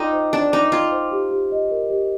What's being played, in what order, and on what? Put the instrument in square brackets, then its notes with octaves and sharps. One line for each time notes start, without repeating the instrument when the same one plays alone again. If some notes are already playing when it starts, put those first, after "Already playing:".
Already playing: [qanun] D#4 F4 [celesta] A4 G5 D6
[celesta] C5
[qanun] D4 [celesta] A4
[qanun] D#4 [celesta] D6
[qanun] F4 [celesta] G5
[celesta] C5
G4
G4
D#5
A#4
G4